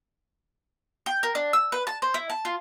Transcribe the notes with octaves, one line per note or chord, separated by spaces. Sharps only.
G5
A#4
D4
E6
B4
A5
C5
E4
A5
F4